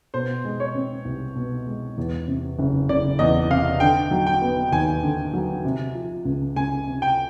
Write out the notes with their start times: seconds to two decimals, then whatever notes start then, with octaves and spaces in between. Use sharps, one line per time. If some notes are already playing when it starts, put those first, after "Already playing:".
0.14 B2 C5
0.45 G#3
0.60 C#5
0.75 C4
1.05 C2
1.35 B2
1.67 G#3
1.98 E2
2.28 C3
2.59 F#1
2.89 F#1 D5
3.19 E2 D#5
3.50 C3 F5
3.80 D3 G5
4.11 F#3
4.26 G5
4.42 B3
4.72 D#2 G#5
5.03 D3
5.34 F#3
5.65 C3
5.95 F3
6.25 C#2
6.56 C#2 G#5
6.87 C3
7.02 G5